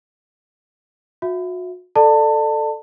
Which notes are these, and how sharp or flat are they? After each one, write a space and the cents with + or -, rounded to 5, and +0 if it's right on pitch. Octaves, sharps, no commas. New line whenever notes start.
F#4 -35 E5 +5
A4 +0 D5 +30 A5 +25